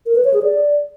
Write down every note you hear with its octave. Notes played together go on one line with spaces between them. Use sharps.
A#4
B4
C#5
G#4
D5